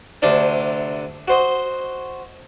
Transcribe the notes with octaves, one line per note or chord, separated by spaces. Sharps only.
D2 C3 D4 D5
F#4 C5 D#5